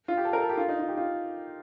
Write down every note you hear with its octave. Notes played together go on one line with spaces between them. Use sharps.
F4
G4
A4
A#4
A4
G4
F4
D#4
F4
G4
F4